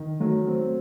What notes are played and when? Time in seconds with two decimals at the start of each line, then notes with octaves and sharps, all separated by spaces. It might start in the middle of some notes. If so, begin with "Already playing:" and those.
Already playing: D#3
0.20 F#3 A3
0.47 C4